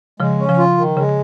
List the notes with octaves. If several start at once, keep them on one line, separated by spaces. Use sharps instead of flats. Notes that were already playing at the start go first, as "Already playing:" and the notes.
C#3 F3 G#3
C#4
C#3 F3
F4
D#3
C#3 G#3